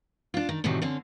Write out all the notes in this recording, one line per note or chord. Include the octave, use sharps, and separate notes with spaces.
D4 F4
D#3
A2 C3 D#3 E3 F#3 G3
D3 C4 C#4